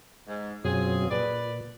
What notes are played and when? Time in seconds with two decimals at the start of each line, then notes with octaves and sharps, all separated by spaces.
0.28 G#2
0.65 F#2 B2 F#3 C4 F4 G#4
1.11 A#2 B4 D5